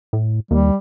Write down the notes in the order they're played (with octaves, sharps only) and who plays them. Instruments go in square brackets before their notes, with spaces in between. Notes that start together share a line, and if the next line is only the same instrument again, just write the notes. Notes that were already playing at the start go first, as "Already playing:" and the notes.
[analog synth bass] A2
[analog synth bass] D#2 [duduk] G3